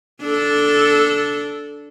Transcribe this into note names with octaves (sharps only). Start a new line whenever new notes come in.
D4 A4